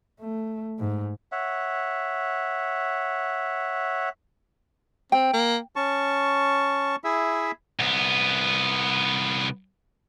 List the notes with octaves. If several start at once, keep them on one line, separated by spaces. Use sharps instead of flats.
A3
G#2
C#5 E5 F#5
C4 G5
A#3
C#4 A5 C#6
E4 G#4 E5
C2 B3